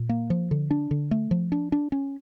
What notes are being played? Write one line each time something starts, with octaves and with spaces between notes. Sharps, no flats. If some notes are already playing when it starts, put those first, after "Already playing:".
Already playing: A#2
A#3
F3
D3
D4
D3
A3
F3
D4
D4
C#4